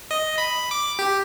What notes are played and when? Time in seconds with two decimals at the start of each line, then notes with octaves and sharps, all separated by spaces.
0.11 D#5
0.38 B5
0.71 D6
0.99 G4